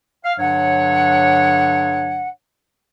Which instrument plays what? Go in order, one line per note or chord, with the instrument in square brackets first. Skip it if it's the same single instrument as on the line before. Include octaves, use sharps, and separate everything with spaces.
[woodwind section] F5
G2 D3 F#3 D4 C#5 F#5